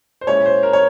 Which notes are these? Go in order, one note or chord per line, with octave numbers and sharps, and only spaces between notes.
C5
A#2 G#3 C#4 E4 C#5
C5
A#4
C#5